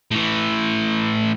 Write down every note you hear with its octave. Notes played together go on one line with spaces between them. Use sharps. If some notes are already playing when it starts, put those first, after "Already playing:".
A2 E3